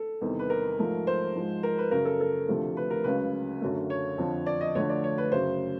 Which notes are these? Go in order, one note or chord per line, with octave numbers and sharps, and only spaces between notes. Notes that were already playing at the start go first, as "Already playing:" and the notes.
Already playing: A4
E2 C3 D#3 G3
B4
A#4
G#2 F3 A3
C5
G#2 F3 G#3
A#4
B4
F#2 C#3 F#3 A#4
A4
A4
D2 C3 F3 A3
B4
A#4
C#2 C#3 F#3 B4
F#2 D3 F#3 A3
C#5
F2 D3 F3
D5
D#5
D2 D3 F3 A3 C#5
D5
C#5
B4
F#2 C#3 F#3 C5